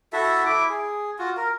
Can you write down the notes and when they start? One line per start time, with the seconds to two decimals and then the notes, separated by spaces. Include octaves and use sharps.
0.13 E4 F#4 A4 E5
0.46 E4 D6
0.69 G#4
1.19 F4 F#4
1.37 A#4